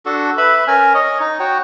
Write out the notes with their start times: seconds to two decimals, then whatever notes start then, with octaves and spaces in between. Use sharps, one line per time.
0.06 D4 F#4 A4
0.38 B4 E5 B5
0.67 C#4 A#4 G#5
0.94 C#5 D#5
1.20 D#4
1.40 F#4 C#5 G5